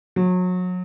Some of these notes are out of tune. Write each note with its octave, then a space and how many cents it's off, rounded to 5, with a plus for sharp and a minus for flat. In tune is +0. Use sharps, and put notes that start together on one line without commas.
F#3 -30